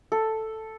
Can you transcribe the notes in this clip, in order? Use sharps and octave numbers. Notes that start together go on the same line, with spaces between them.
A4